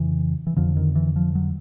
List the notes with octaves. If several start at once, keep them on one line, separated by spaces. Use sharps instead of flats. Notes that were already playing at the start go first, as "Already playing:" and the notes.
Already playing: F2 C#3 E3
E3
F2 D3 F3
D#3
E3
F3
F#3